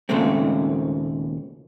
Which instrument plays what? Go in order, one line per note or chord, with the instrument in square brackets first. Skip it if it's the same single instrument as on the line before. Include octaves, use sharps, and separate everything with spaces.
[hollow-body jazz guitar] D#2 A#2 C#3 G#3 A3 C4